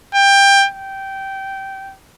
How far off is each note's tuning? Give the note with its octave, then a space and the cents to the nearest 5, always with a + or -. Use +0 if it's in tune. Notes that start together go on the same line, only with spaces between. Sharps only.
G5 +20
G5 -15